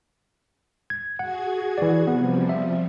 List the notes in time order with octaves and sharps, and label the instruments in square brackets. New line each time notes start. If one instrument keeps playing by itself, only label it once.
[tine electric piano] G#6
[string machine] F#4 G#4 G#6 [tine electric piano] F#5
[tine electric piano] E3 D5
[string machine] C3 F3 G3 [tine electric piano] B3
[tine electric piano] E5